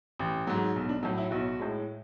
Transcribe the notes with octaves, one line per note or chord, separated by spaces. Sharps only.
A1
G#2 F#3
B1
D4
A2 F#3
E4
B1 F#4
A2 G#3